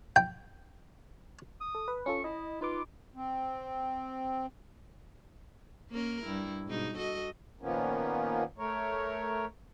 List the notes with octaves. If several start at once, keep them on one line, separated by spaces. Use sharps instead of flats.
G5
D#6
A4
B4
C#4 F4 A4 C#6
E4 D#5
D#4 F4 B4 D6
C4
A#3 C#4 A#4
G2 E4
G#2 B2 D#4
F#4 A4 D#5
A#2 D#3 F3 A#3 B3 C#4
A3 A#4 C#5